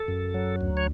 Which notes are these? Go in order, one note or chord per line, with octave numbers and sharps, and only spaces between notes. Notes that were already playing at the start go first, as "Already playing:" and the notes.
Already playing: A4
F#2
F#3
D2
C#5